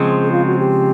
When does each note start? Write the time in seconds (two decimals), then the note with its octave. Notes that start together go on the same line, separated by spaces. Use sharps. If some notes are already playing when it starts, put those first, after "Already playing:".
Already playing: C#3 F3 G#3 C4 G#4
0.32 F4
0.46 F#4
0.59 G4